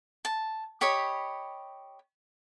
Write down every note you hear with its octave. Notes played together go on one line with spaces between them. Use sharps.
A5
G4 C#5 D#5 B5